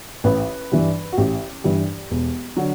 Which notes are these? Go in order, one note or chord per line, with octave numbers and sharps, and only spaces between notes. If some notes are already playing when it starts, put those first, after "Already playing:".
A1 B4
G2 E3 G3
F#4
A1 G4
G2 E3 G3
E1
D3 F#3